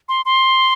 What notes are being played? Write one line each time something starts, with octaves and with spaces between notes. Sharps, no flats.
C6
C6